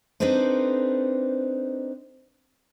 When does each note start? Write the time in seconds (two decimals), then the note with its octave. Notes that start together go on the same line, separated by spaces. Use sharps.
0.20 C4 D4 D#4 A4 B4 C5